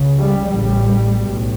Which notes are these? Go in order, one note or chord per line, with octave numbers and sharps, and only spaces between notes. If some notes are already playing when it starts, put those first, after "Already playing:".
Already playing: C#2 C#3
G3
A1 A2 G3
B1 A2